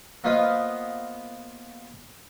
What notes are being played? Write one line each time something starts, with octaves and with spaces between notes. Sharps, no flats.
A#3 B3 F4 C5 D#5 F5